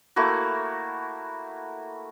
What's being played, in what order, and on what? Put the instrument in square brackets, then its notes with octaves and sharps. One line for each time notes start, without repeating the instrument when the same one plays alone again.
[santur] A3 A#3 E4 F#4